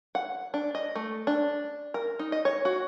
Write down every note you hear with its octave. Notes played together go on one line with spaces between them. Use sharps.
F#5
D4
D#5
A3
D4
A#4
D#4
D#5
C#5
F#4